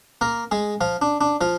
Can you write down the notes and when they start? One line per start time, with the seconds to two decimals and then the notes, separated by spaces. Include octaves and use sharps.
0.21 A#3 A#4
0.51 G#3 G#4
0.81 F3 F4
1.02 D4
1.21 D4
1.41 F3 F4